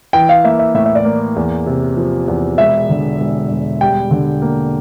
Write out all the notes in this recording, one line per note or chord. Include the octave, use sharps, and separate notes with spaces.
E3 G5
F5
A#3 E5
E5
A2 E5
E5
D5
A#3
E2
C3
F3
E2
E1 E5
D3
E1
E1
G3 G5
D3
A#3